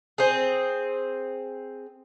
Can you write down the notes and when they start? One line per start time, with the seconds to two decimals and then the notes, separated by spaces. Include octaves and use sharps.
0.18 C4 G#4